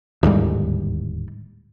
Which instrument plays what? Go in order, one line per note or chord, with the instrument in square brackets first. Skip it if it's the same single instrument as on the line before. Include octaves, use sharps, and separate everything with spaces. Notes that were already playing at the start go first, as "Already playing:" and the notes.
[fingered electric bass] D1 D#2 G#2 G3